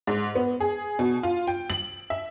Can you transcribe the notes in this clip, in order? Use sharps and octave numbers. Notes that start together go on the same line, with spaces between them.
G#2
B3
G#4
B2
F4
G5
F#7
E5